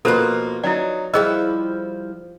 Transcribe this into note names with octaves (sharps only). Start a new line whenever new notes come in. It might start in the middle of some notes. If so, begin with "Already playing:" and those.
B2 F3 A#3 F4 A4 B4 C5
F#3 D#4 E4 D5
F3 G3 E4 G#4 C5 D#5 E6